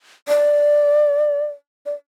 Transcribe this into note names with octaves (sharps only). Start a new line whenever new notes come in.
D5
D5